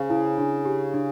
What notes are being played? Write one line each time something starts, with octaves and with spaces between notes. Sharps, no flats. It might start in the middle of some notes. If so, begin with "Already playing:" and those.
Already playing: C#3 C5 F5
E4
D4
G4
D4